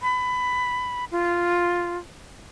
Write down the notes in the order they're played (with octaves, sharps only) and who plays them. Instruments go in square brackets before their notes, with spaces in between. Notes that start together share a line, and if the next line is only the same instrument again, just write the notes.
[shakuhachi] B5
F4